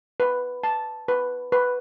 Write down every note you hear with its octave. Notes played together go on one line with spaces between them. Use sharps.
B4
A5
B4
B4